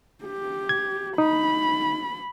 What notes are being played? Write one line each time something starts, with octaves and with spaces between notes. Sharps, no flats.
G4
G#6
D#4 B5